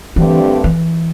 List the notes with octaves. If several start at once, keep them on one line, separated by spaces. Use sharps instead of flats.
G2 D3 E3 A3 C4 G4
E3